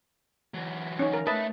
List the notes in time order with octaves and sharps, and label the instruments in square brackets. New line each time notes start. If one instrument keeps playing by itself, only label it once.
[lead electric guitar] E3 F#3
[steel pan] C#4 D#4
A#4
[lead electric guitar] A3 E5 [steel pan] B4 D#5 A5